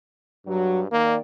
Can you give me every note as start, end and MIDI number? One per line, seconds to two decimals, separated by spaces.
0.46 0.86 43
0.46 0.78 54
0.92 1.17 51
0.92 1.17 58
0.92 1.17 74